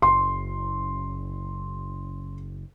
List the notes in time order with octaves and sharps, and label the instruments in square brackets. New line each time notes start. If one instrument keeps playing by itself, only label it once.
[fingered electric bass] F#1 [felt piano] C6